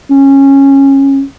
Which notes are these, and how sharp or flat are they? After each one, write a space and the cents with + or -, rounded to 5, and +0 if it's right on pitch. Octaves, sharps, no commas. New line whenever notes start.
C#4 -15